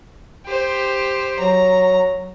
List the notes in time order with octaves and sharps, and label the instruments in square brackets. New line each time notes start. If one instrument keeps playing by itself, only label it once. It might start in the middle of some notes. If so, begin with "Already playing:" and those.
[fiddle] G4 C5
[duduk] F#3 [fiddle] A#5